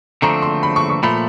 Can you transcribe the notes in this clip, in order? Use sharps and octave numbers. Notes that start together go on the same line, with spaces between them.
D3 F3 A3 C4 A#5
C6
B5
C#6
C#6
A#2 F3 A3 B5